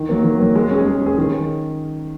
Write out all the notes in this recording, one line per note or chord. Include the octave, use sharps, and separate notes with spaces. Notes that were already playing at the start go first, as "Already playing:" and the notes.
Already playing: D#3
F#3 A#3
D#3
F#3 A#3
G#3
C#4 G#4
G#3
C#4 G#4
D#3